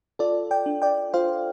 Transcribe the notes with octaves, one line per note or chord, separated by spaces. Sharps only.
F4 A4 D5
D5 G5
D4
D5 G5
F4 C5 F5